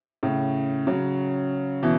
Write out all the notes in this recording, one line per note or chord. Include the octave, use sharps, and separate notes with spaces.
A2 C#3
C#3 F#3
B2 E3